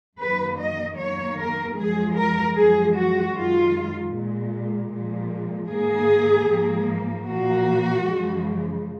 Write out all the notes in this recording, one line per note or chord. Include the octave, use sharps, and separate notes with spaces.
F#2 D#3 F#3 A#3 B4
D#5
F#2 D#3 A#3 C#5
A#4
F#2 F3 G#3 G#4
A#4
F#2 F3 G#3 G#4
F#4
F#2 D#3 G#3 F4
A#2 G#3
A#2 F3 G#3
G#2 D#3 A#3 G#4
G#2 F3 A#3
A#2 F3 A#3 F#4
F#2 C#3 F3 G#3